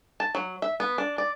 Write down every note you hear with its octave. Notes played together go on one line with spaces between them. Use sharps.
A5
F#3
E5
B3
D4
D5